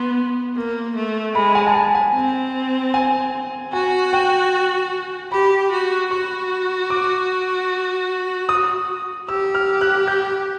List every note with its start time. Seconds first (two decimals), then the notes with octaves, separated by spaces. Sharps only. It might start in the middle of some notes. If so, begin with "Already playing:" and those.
Already playing: B3 C6
0.56 A#3
0.96 A3
1.35 G#3 B5
1.55 G#5
1.67 A5
1.75 G#5
1.95 G#5
2.14 C4
2.94 G#5
3.73 F#4 G#5
4.13 G5
5.32 G4 B5
5.72 F#4
6.11 F#4 C#6
6.90 D6
8.49 D#6
9.28 G4 E6
9.55 F6
9.81 F#6
10.08 G6